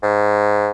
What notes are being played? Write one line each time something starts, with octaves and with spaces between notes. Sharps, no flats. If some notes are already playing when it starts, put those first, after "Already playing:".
G#2